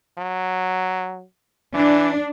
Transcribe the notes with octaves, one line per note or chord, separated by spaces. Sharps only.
F#3
E3 D4